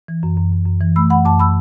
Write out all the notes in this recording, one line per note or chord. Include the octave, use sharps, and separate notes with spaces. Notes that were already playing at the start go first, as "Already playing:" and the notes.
E3
F#2
F#2
F#2
F#2
E3
A3 B5 E6
F#2 F#5 B5
F#2 A5 D6
B5 E6